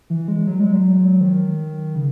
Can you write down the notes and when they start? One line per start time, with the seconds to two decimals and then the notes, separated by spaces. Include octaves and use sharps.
0.10 E3
0.28 G#3
0.47 F#3
0.60 G#3
0.73 F#3
1.21 D#3
1.95 C#3